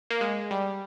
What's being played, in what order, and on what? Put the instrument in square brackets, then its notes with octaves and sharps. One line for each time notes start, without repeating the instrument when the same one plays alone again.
[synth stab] A#3
G#3
G3